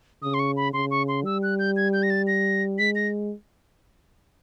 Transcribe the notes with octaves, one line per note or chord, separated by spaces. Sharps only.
C#3 D#6
C6
C#6
B5
C#3 C6
C#6
C6
G3 E6
F#6
G6
G#6
G6
A#6
A6
A#6
G#3 B6
A#6